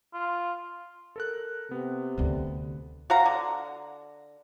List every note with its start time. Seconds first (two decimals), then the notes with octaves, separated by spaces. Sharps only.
0.14 F4
1.16 A4 A#4 F#6
1.71 C3 B3
2.18 D2 D3
3.10 F#4 F5 A#5
3.26 D3